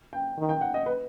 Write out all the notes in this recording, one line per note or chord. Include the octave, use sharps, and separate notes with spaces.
G5
D#3
G5
F#5
D#5
B4